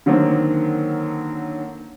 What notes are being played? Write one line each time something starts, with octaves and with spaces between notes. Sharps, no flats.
D3 D#3 F#3 A#3 C4